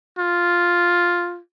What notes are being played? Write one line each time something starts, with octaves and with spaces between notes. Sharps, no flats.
F4